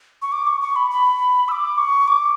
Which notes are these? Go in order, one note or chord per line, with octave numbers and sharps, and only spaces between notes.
C#6
D6
C#6
C#6
B5
B5
E6
D6
C#6
D6